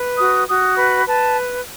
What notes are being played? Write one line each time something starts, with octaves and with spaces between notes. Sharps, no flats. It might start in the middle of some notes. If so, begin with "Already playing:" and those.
Already playing: B4
F#4 D#6
F#4 D#6
B4 B5
B4 A5